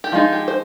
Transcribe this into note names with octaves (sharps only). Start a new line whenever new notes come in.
G4
F3 G#3 D#4 F4
G4
C5